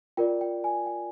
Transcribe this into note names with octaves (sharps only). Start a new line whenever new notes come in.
F4 A#4 D5 G5
G5
G#5
G5